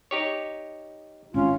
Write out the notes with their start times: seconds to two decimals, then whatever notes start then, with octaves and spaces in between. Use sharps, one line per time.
0.11 D#4 G4 C#5
1.34 G#1 C#4 F4